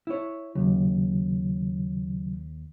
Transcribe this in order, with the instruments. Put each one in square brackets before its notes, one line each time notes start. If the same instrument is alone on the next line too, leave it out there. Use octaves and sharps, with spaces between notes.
[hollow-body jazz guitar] E4 C#5
[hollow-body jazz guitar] D#2 [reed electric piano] C#3 F#3